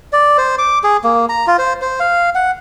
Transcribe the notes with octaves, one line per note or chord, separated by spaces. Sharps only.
D5
C5
D6
G#4
A#3
A#5
F4
C5
C5
F5
F#5